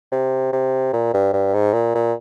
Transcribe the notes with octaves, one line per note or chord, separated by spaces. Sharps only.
C3
C3
A#2
G2
G2
G#2
A#2
A#2